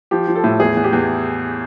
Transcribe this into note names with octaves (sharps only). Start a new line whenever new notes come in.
F3 G4
F3
A4
A2
E2 G#4
E2
G4
E2